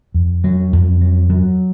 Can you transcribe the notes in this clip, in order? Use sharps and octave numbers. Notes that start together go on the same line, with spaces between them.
F2
F#3
F2
F#3
F#3